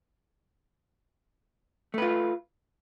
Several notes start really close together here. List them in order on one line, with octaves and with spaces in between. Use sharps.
A3 B4 F4